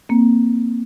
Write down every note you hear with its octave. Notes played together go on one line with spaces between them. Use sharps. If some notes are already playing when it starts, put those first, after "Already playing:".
A#3 C4